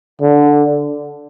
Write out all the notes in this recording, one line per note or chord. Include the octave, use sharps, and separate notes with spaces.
D3